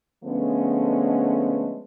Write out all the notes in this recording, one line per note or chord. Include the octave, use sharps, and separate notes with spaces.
D3 F3 G#3 A3 B3 C#4